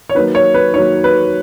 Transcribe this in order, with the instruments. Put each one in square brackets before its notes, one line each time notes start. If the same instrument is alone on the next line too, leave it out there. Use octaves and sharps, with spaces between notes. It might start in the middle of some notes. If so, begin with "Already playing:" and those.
[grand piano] C#5
[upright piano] D#3 F#3 A#3 [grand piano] B4
[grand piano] C#5
B4
[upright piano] D#3 F#3 A#3 [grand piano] C#5
[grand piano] B4